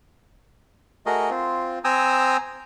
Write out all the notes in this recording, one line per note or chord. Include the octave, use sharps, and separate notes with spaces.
A3 F#4 G#4 A#4 D#5
C4 F4
C4 G5 G#5 A#5 D#6 E6